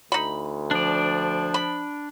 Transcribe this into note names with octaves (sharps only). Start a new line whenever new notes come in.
D2 D#4 B5
F3 D4 D5
B5